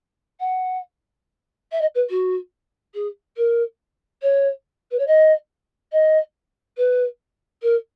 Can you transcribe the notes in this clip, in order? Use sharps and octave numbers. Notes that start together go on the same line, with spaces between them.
F#5
E5
D#5
B4
F#4
G#4
A#4
C#5
B4
C#5
D#5
D#5
B4
A#4